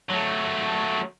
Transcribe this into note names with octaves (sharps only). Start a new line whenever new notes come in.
F#3 A3